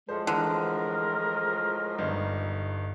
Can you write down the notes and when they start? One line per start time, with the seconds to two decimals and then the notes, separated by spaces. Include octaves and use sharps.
0.09 A2 F3 G#3 A4 C5
0.27 D3 E3 A#4
1.98 G1 G2 D#4